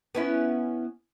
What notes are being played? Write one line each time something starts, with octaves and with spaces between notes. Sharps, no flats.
B3 C#4 E4